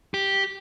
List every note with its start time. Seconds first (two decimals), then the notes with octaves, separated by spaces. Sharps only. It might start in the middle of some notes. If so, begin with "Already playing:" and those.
0.14 G4